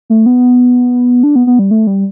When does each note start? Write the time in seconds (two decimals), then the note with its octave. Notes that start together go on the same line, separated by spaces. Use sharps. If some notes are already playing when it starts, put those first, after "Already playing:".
0.10 A3
0.26 B3
1.23 D4
1.36 B3
1.47 B3
1.59 G3
1.71 A3
1.87 G3